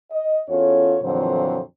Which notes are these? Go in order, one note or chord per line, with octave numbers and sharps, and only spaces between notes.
D#5
E2 C#4 F4 A4 C#5
F2 A#2 D3 E3 F#3 C5